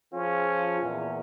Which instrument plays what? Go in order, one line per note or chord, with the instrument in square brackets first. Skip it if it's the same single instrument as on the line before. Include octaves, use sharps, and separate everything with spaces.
[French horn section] F3 F4 G#4 [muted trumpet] C#4
[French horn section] E2 A#2